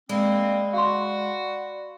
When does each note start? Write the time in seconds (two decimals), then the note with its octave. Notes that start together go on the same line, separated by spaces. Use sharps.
0.09 G#3 A#3 C4 D5 B5
0.73 F#4 F5 C6